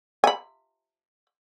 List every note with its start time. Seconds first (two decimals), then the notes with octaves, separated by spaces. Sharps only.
0.24 G#5 B5